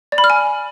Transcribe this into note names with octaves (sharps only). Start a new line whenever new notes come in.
D5
B5
F6
G#5